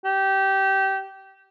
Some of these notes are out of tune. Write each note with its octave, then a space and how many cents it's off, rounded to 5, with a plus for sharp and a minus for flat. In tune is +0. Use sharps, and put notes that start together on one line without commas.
G4 -20